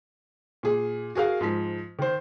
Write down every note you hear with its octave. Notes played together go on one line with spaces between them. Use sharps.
A#2 G#4
F#4 G#4 A#4 F5
G#2 F3 B6
D#3 C5